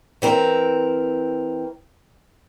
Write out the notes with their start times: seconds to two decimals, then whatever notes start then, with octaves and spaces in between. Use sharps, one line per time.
0.22 E3 C4 A#4